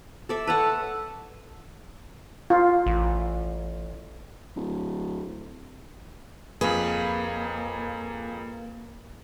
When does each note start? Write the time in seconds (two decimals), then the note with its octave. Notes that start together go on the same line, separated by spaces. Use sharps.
0.29 A4 D5 E5
0.47 A4 B4 C#5 F#5
2.50 F4
2.86 A1
4.56 D1
6.61 F2 A#3 F4 G#4 B4